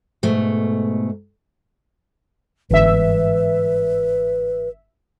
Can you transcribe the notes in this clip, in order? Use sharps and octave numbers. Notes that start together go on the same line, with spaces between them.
G#2 B2 A3
G1 G#2 E3 B4 E5